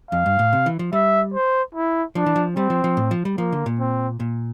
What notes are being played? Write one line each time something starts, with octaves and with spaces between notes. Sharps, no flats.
F2 F5
G2
A2
C3
E3
F3
G3 E5
C5
E4
F3 D4
E3
F3
G3 C4
F3
F3
A2
F3
G3
F3 A#3
D3
A#2
C4
A#2